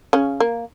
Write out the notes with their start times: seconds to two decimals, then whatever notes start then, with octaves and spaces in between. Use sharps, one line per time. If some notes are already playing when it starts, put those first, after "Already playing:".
0.13 C#3 C#4
0.40 A#3